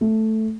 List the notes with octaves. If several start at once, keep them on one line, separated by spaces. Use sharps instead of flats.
A3